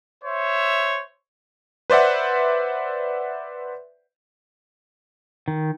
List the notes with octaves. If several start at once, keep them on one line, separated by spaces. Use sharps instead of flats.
C5 C#5 E5
B4 C5 D5 E5 F#5
D#3